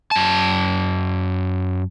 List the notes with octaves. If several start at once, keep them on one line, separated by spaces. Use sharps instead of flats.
F#2 A5